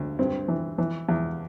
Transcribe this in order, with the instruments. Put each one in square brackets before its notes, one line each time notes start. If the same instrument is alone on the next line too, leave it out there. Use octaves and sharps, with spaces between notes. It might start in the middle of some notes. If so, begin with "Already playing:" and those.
Already playing: [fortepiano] D2
G2 C4
E3
E3
E2